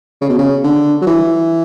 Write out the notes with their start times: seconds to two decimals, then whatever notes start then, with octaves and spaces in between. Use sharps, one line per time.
0.21 C#3
0.29 B2
0.38 C#3
0.64 D3
1.01 F#3
1.07 E3